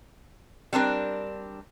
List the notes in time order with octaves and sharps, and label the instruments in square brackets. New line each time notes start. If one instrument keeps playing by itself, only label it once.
[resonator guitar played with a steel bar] G3 C4 D4 A#4